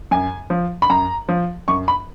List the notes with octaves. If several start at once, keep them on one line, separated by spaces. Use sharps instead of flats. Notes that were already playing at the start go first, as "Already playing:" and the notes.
F#2 G#5
F3
B5
F#2 A#5
F3
F#2 C#6
B5